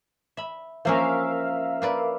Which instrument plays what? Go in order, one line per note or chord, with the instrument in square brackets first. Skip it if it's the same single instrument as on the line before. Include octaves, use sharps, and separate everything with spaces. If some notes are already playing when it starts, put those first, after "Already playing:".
[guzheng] E5 B5
[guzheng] F3 A#3 C#4 [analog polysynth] A#4 E5 F5
[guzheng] A#3 B4 D5